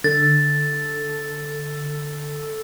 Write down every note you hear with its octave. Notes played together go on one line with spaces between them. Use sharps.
D3 A4 A6